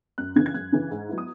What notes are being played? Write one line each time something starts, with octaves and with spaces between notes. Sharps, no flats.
F#2 F#6
C#3 E3 G#6
G#6
F#2 F#6
C#3 E3
G#2
F#3 B3 E4
D#6